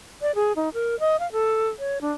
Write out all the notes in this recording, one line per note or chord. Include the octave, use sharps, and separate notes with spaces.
D5
G#4
D#4
A#4
D#5
F5
A4
C#5
D4